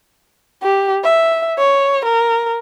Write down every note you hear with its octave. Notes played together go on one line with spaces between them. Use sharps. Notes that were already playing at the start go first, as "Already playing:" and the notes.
G4
E5
C#5
A#4